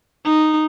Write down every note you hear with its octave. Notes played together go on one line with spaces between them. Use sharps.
D#4